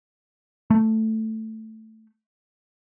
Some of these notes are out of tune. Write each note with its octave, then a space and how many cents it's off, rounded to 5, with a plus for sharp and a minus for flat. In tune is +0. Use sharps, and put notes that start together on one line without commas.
A3 +5